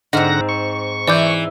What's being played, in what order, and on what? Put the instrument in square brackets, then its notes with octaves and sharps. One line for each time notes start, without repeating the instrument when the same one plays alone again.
[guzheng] G#2 C4 [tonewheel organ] D3 F#5 A#6 [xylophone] D#5 F6
[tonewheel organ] C#6
[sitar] E3 [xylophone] D5 D6 G6